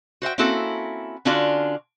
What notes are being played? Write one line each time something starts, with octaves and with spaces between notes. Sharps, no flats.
F#4 C5 E5 G5
A#3 C4 C#4 E4 F#4 A4
D3 C#4 D4 F4 F#4 D5